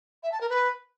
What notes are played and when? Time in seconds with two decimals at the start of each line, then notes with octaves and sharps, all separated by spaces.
0.23 E5
0.32 A5
0.41 A#4
0.49 B4